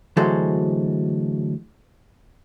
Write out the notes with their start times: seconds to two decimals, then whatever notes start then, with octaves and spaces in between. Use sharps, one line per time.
0.17 D2 E3 F#3 G#3 A4 C5